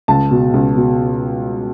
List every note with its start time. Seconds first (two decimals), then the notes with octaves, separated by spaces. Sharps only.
0.08 C#2 A5
0.31 B2
0.54 C#2
0.76 B2